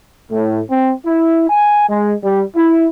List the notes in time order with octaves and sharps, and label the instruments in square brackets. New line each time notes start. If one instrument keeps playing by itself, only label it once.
[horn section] A2
C4
E4
G#5
G#3
G3
E4